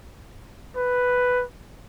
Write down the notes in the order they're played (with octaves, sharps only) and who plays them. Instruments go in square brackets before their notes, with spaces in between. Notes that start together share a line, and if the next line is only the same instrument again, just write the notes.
[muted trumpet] B4